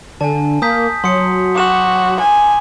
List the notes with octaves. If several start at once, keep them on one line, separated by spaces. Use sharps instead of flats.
D3 G#5 A5
A#3 D#6 G6 B6
F#3 C6 D#6 C#7
F#4 D6 E7 F#7
G#5